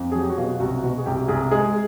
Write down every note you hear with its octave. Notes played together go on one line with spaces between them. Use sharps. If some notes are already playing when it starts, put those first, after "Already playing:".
Already playing: F2
F#3 G#4
G4
F#4
B2 F4
C2 F#4
B2 F#4
G#4
C2 G4
C2 G#4
G#3 G#4